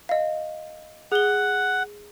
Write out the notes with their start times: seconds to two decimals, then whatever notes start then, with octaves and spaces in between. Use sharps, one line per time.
0.09 D#5 F5
1.12 G#4 F#5 G7